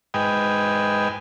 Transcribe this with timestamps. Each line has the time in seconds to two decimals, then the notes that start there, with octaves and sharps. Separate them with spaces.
0.14 G#2 B4 D#5 G5 G#5